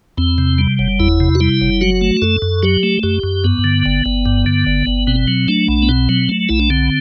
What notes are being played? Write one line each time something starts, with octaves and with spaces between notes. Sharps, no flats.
E2 C4
C3
G3
F#1
E2 E4
C3
F#4
G3 E4
F#1
F#3 F#4
A3
F#2 A4
F#2
F#3 G4
A3
F#2 G4
F#2
G2 B3
D3
G1
G1
G2
D3
G1
G1
B2 C4
F#3
A3 D4
B1
B3
B2 C4
F#3
A3
B1 E4
D4
D3 C4